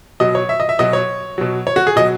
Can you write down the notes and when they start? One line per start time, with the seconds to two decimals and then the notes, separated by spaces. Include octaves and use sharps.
0.20 B2 F#3 D#5
0.35 C#5
0.49 E5
0.60 D#5
0.69 E5
0.79 B2 F#3 D#5
0.93 C#5
1.38 B2 F#3
1.67 C#5
1.76 F#4
1.87 G#4
1.96 B2 F#3 D#5